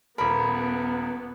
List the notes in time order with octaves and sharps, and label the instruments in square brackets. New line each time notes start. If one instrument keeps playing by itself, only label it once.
[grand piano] D#1 A#4 [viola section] B3 [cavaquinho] B5